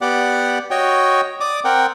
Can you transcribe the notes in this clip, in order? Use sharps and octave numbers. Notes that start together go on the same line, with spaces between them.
B3 G4 D5 F#5
F#4 C#5 D#5 G5
D5 D6 D#6
C4 A#4 F#5 G5